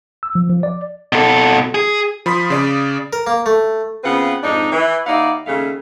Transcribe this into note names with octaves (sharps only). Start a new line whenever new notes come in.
E6
F3
F3
D5
B2 A4
G#4
F3 B5 C6 D#6 B6
C#3 D5 D#6
A#4
A#3
A3
C#3 B3 C4 F4 B4 F#5
F2 G#2 D4 D#4
E3
D#2 D#4 E4 D5 F5 F#5
D#2 C#3 G#3 A3 F5